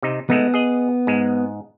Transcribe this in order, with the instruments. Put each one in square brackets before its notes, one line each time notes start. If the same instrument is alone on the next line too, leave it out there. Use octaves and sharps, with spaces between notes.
[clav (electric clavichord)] C3 D#4
[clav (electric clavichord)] G#3 A3 D#4 [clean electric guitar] B3
[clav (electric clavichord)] G#4 D#5
G#2 G#3